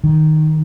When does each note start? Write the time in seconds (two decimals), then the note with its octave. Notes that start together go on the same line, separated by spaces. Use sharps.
0.04 D#3